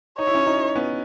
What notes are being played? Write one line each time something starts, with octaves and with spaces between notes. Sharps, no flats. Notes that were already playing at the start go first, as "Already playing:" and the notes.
D#4 C#5
E4
C#4 D#4
C#4 D#4
B3 C#4